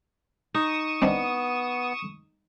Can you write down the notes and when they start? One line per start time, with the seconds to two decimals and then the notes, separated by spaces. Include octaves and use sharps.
0.54 D#4 C#6 D#6 E7
1.02 B3 C4 D4 D#5